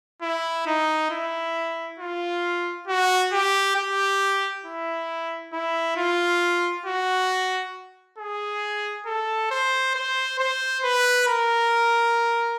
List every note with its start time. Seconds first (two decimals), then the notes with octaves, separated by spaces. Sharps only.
0.22 E4
0.66 D#4
1.11 E4
1.99 F4
2.88 F#4
3.32 G4
3.76 G4
4.65 E4
5.53 E4
5.97 F4
6.86 F#4
8.18 G#4
9.06 A4
9.51 C5
9.95 C5
10.39 C5
10.84 B4
11.28 A#4